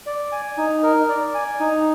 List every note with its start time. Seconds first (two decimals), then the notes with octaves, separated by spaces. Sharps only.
0.06 D5
0.32 G#5
0.58 D#4
0.83 A#4
1.09 D5
1.34 G#5
1.60 D#4